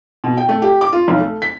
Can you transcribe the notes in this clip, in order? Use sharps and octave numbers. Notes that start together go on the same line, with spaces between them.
B2
G5
A3
G4
D6
F4
B1
A3
B6